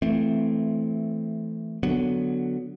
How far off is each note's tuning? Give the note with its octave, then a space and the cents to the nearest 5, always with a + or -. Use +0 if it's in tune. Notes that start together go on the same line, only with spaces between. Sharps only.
E3 +10 A3 +0 C4 -5
D3 +0 F#3 +0 B3 +0